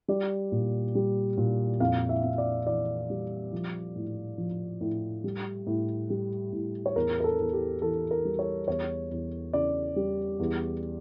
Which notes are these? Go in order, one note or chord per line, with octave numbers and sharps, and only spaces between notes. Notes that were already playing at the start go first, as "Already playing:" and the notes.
G3 D5
A#2
G3
A#2
F2 F5
E5
F2
D5
E3 D5
G3
F3
A2
F3
A2
G3
A2
G3
A2
C#5
E2 A#4
A#4
A4
E2
G4
E3 A4
A#4
G3
C#5
E2 C#5
E2
C#3 D5
G3
E2